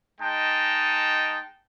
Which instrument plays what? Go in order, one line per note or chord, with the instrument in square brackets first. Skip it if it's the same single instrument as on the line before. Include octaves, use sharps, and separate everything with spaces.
[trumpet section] G#3 D#4 G5 A5